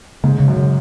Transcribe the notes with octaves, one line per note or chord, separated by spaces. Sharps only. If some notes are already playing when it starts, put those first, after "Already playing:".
G#2 C#3
C#3
F#2
C#3